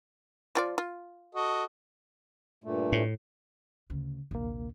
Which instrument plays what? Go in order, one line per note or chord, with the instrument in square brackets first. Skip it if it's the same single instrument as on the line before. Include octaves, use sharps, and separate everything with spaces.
[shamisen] F3 F4 D5
F4
[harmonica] F#4 A4 D#5
[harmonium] G2 A#2 A3
[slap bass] A2
[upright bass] D2 C#3
[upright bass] A#1 C3 [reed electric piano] D#2 A#3